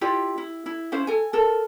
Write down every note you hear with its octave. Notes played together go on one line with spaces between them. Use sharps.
E4 F4 G4 D5
E4
E4
C#4 E4 C5 F5
A4 G#5
A4 A#4